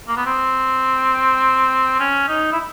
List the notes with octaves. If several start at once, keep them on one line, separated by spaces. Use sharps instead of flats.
A#3
B3
C4
C#4
D#4
E4